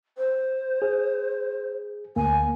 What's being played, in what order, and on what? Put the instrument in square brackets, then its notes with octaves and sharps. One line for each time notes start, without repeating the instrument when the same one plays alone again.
[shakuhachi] C5
[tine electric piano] G#4
[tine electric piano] D2 A#3 [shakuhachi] G#5